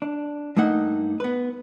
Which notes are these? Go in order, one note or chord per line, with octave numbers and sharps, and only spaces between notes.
D4
G2 A3 A#3 D#4 F#5
B3 B4